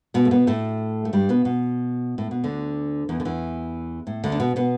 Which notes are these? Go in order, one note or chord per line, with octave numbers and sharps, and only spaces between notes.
B2 B3
A3
B2 B3
A2 A3
A3
G2 G3
B2 B3
B2
A2
B2
D2 D3
E2 E3
D3
E2 E3
A2
D2 D3
D4
B2 B3
B2 B3